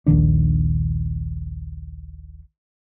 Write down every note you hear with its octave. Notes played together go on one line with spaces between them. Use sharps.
D#1 A#1 D#3 D4